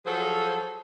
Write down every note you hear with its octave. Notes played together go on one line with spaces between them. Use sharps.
F3 F#3 G#4 A4 C5